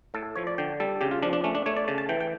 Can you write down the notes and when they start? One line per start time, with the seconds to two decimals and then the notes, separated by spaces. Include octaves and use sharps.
0.14 A2 A4
0.36 F3 C#5
0.47 D5
0.58 D3 G5
0.80 G3 A4
1.01 C#3 G4
1.11 F4
1.22 F3 D4
1.33 D4
1.44 A3 C#4
1.55 D4
1.66 A3 C#5
1.77 D5
1.88 C#3 A5
1.98 A5
2.09 E3 G5
2.21 G5